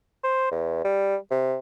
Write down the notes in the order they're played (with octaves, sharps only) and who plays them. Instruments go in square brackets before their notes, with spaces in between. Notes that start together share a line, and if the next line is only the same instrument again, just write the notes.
[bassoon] C5
E2
G3
C3